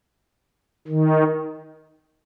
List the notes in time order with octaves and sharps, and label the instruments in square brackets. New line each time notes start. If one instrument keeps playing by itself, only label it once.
[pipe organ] D#3